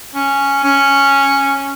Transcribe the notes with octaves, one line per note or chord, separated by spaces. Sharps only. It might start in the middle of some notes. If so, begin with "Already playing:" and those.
C#4
C#4